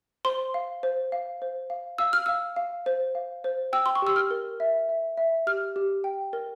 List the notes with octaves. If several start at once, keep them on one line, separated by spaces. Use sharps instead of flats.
C5 C6
F5
C5
F5
C5
F5
F5 E6
F6
F5 E6
F5
C5
F5
C5
G5 E6
C6
C#6
G4 E6
F6
A#4
E5
E5
E5
G4 F6
G4
G5
A#4